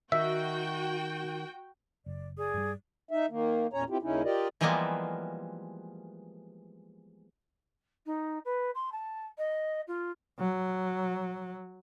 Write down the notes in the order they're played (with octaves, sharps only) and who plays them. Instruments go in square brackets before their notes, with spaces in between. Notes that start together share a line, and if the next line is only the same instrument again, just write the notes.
[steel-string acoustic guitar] D#3 [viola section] F#4 G5 [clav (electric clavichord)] E5
[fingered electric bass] F#1 [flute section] D5
[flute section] G#4 D5 D#6
[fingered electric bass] G2 G3
[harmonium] D#4 E5
D#3 A#3
E2 A#2 C#4 C#5 A#5
C4 E4 F4 G4
D#2 C#3 C#4 D#4 E4
F4 G4 A#4 D5 D#5
[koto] E3 F3 G3 G#3 A#3 B3
[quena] D#4
B4
C6
A5
D#5
F4
[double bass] F#3